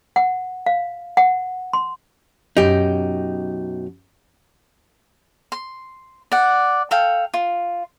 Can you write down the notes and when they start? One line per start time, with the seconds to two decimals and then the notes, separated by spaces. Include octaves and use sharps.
0.16 F#5
0.66 F5
1.17 F#5
1.73 C6
2.57 F#2 B2 D#4 G4
5.52 C6
6.32 D5 F#5
6.91 A4 F5 G5
7.34 F4